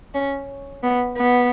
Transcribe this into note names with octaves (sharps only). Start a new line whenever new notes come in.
C#4
B3
B3